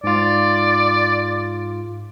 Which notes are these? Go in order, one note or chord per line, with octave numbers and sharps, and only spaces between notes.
G#2 F4 D5